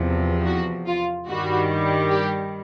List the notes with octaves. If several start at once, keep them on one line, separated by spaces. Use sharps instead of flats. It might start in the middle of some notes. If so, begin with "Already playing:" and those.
Already playing: E2 C3 F3
F#4
F4
G2 D#3 G3 F#4
G4